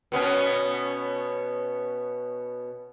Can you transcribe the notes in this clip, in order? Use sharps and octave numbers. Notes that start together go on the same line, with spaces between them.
B2 B3 C#4